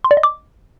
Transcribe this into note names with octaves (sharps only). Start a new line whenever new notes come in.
C6
D5
D#5
D6